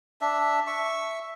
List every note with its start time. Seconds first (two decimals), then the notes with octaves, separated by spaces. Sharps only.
0.21 D4 E5
0.67 E5 C#6